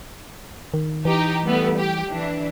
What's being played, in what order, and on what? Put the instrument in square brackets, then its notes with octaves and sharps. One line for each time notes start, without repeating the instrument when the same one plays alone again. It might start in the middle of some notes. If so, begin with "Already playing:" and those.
[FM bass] D#3
[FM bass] E3 [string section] D#4 G4
[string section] G3 A3 B3
G4
E3 D4